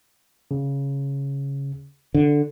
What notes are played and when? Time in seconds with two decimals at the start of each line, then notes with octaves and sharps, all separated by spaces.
0.51 C#3
2.14 D3